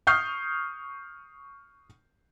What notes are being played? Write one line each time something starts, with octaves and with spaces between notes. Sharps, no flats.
C#6 D#6 F6 G6 C7